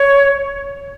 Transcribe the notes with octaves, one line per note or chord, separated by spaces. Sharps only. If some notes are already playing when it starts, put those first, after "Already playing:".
Already playing: C#5